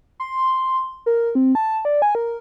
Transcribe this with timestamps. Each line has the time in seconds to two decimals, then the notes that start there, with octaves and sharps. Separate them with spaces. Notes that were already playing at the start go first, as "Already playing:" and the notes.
0.20 C6
1.06 A#4
1.35 C4
1.55 A5
1.85 D5
2.02 G#5
2.15 A#4